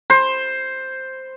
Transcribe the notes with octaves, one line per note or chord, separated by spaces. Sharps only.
C5